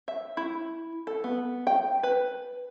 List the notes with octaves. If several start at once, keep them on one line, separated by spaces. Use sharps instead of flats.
E5
E4
A4
B3
G5
B4